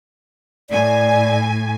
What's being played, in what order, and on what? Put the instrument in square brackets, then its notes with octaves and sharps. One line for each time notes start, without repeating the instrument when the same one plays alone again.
[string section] A2 G#5 [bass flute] D5